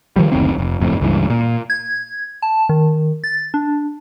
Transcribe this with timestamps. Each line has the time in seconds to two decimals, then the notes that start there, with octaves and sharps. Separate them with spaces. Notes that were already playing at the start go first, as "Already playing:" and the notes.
0.16 D#3 F3 G3
0.32 F#1 D2 D#3 C4
0.58 F1
0.80 F#1 F2 A2
1.01 C#2 G2 E3
1.30 A#2
1.70 G#6
2.42 A5
2.69 D#3
3.24 A6
3.54 D4